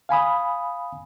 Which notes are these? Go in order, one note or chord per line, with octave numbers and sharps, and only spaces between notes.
F5 G#5 B5 D#6